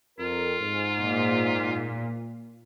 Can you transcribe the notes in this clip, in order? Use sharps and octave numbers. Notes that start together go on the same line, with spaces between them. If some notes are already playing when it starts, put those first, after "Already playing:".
F2 C4 F4 A#4
G#2
A#2